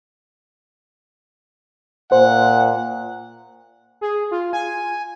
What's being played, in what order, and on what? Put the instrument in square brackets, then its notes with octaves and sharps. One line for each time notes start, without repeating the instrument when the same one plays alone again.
[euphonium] A#2 [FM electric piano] C5 [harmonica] F#5
[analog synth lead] G#4
F4
G#5